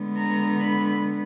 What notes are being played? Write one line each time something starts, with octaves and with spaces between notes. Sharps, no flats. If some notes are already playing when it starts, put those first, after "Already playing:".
Already playing: D3 G#3 B3
A#5
B5